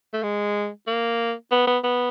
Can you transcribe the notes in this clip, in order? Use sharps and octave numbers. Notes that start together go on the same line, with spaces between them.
A3
G#3
A#3
B3
B3
B3